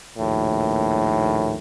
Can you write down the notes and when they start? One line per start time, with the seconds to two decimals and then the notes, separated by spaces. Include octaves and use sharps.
0.18 A#1 D#2 A2